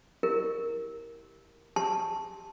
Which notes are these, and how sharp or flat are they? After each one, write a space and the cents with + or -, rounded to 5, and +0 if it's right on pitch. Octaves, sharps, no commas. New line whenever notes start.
E4 +0 G4 +0 A#4 +0
G4 +0 A5 +0 C6 +10